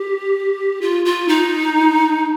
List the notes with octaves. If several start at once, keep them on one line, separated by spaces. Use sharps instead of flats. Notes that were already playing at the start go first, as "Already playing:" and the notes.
Already playing: G4
F4
F4
D#4